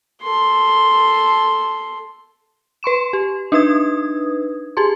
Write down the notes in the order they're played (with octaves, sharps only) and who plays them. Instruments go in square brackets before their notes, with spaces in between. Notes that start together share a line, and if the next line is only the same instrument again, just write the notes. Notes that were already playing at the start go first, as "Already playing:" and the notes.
[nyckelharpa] A4 C6
[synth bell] B4 C6 C#6 E7
G4
D4 D#4 B4 D#6 G#6
G4 G#4 C6